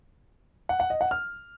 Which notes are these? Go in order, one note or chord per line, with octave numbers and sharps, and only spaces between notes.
F#5
F#5
D#5
F#5
F6